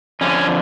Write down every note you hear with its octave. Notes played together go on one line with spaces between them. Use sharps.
F2 D3 F3 C#4